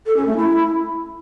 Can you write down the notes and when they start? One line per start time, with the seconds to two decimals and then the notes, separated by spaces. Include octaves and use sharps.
0.06 A4
0.17 C#4
0.27 A3
0.37 E4